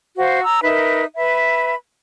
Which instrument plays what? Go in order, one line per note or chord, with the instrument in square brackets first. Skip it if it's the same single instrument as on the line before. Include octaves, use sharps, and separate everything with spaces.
[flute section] F#4 C5 F5
A#5 E6
D#4 A#4 B4 E5
B4 E5 B5